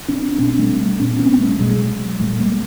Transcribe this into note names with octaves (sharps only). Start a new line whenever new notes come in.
C4 D4
B2 C4 D4
G3 A3
A#2 C4 D4
B3 C#4
G3 A3
B2 F#3 G#3
A#2 G3 A3
G#3 A#3